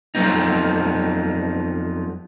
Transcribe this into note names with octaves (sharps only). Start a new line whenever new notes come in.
F2 F3 F#3 A#3 B3 D#4